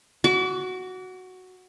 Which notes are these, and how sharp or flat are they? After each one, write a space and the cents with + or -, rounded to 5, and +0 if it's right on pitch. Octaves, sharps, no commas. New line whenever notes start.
F#4 +0 D6 -40